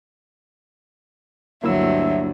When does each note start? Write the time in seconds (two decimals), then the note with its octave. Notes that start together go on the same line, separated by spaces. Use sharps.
1.64 D2 G2 F#3 A#3 E4 E5 E6